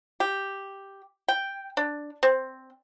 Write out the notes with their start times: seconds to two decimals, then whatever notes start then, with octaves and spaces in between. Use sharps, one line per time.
0.20 G4
1.28 G5
1.77 D4
2.23 C4